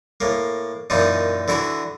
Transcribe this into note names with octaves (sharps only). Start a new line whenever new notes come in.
A2 A#3
F#2 A#2 E3 D#4
D3 E3 E4 F#4